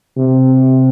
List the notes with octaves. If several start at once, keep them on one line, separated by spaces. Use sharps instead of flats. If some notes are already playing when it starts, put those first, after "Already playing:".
C3